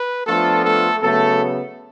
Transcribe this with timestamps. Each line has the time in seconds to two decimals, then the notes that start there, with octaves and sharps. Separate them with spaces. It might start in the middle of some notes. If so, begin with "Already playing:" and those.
Already playing: B4
0.27 F3 A3 B3 D4 F4 A4
0.64 A3 A4
1.02 C#3 F#3 A3 B3 A4